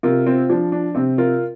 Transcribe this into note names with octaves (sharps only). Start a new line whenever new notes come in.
C3 F4 A#4
C4 F4
F3 D4
D4
C3 C4
F4 A#4